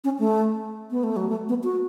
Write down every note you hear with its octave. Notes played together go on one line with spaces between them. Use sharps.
C#4
A3
B3
A3
F#3
A3
B3
F#4